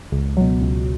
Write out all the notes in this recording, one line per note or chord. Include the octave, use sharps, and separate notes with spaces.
C#2
B2 F#3
C#2